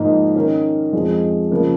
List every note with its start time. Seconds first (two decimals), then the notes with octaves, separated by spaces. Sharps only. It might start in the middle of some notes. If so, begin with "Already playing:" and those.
Already playing: G#2 F3 A#3 D#4
0.35 D#3 C#4 A#4
0.93 F2 F3 G#3
1.51 C#3 F3 A#3 F4 A#4